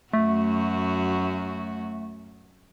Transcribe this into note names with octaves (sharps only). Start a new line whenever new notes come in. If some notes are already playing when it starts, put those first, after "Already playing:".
F#2 A3 F#4